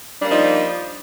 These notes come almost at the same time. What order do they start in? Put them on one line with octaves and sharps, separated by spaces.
D4 G3 A#3 F3 D#4